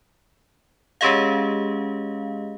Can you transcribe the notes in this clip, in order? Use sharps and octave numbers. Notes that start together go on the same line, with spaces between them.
G#3 C#4 G4 G#4 D#5 F5